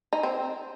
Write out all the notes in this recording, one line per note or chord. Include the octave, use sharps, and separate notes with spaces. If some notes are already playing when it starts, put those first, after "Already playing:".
D#4
C4